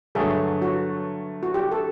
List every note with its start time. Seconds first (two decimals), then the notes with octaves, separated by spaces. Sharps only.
0.15 G2 D3 F#3 A3 G#4
0.62 F#4
1.43 F#4
1.54 G4
1.71 A4